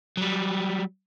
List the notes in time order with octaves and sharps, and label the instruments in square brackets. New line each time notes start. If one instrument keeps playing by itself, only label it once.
[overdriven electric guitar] F#3 G3